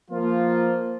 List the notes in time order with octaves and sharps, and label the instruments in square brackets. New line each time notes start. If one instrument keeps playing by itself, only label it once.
[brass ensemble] F3 A#3 F4